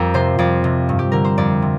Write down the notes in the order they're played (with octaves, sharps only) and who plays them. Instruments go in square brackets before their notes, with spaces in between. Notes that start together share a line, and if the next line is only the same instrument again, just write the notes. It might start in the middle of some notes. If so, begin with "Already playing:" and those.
Already playing: [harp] F2 G4 A#4
C3 C5
F2 D5
C3
G2
G4
D3 A#4
C5
F2 D5
C3